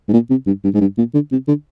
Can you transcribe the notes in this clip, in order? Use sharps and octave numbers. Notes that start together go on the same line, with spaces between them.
G#2
A#2
C3
G2
G2
G#2
G2
A#2
D3
C3
D3